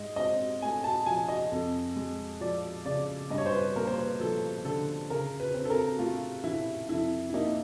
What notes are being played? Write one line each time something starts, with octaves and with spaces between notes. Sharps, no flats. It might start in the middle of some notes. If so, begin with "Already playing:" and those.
Already playing: G#2 D#5
C4 D#5
A3 G#5
A5
F3 G#5
D#5
F2
G#3
F3 D5
C#3 D5
G2 D#5
C#5
C5
B4
A#3 A#4
C5
B4
F3 A4
D3 A4
C#3 A#4
B4
C4
A4
A#4
A3 F4
E3 E4
F2 E4
E4
A#3 D#4